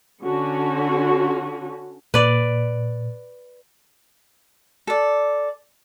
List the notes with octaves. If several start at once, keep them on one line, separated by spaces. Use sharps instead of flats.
D3 C#4 F#4
A#2 B4 D5
A4 D5